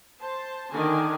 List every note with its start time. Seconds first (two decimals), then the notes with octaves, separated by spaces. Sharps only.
0.21 C5 A5
0.73 D3 D#3 D4 G#5